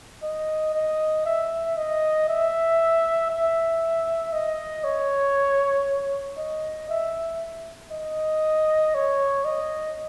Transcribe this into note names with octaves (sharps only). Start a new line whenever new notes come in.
D#5
D#5
E5
D#5
E5
E5
D#5
C#5
D#5
E5
D#5
C#5
D#5